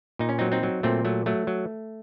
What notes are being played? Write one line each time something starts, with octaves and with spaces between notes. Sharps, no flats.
A#2 D#4
C#4
F#3 C4 D#4
C4 D#4
F#3
A#2 A3 C4
F#3 A3
F#3 A3
F#3